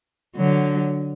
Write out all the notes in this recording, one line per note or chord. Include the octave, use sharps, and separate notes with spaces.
D3 F#3